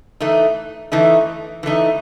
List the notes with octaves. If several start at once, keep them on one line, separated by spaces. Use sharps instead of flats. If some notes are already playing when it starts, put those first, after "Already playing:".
E3 A3 D#4
E3 A3 D#4
E3 A3 D#4